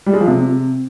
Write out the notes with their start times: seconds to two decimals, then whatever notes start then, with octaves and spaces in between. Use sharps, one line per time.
0.06 G3
0.13 G#3
0.21 F3
0.28 C3